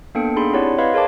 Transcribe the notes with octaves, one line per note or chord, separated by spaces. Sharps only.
A#3 B3 D4 A4 G5 C#7
D4 D#4 G#4 B5 C6
C4 E4 G4 C#5 D5 F#5
B4 D#5 F5 B5 C6 G#6
G#4 A#4 C#5 F5 A5 D6